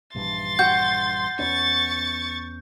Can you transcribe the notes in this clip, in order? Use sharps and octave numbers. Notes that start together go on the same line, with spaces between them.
A#1 G2 E3 C6 A6
F#4 G6
E2 B3 C#4 C#6 A6